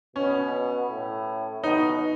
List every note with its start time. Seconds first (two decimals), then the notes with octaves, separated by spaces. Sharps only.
0.16 B2 C#4
0.89 A2
1.63 B2 D#4